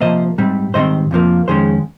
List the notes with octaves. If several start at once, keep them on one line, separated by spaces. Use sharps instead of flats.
C3 F3 A#3 C5 D#5
G#2 G3 C4
G#2 D#3 G3 C4 C5 D#5
F2 C3 F3 A#3
F2 D#3 G#3 C#4 G#4 C5